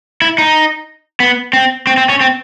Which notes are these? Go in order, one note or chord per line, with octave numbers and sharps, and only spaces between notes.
E4
D#4
B3
C4
C4
C4
C#4
C4